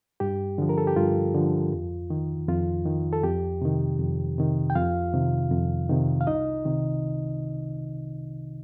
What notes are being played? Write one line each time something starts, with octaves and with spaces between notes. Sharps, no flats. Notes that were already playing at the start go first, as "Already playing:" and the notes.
G2 G4
D3 F3
A#4
A4
G4
G2 F4
D3 F3
F2
D#3
F2 F4
D#3
A4
F2 G4
C3 D#3
F2
C3 D#3
G5
F2 F4 F5
C3 D#3
F2
C3 D#3
F5
C2 D#4 D#5
C3 D#3